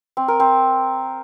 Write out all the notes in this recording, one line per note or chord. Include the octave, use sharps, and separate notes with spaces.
C4
A#4
C4